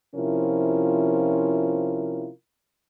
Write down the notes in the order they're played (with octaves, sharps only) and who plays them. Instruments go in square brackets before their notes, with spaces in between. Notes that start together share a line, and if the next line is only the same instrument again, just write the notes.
[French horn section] C3 F3 C#4 E4 F4 A#4